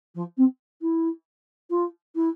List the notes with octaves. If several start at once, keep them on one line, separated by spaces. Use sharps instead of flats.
F3
C4
E4
F4
E4